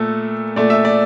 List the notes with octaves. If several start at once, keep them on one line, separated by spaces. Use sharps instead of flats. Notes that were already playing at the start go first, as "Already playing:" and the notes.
Already playing: A#2 A3 A4
A#2 A3 D5
E5
D5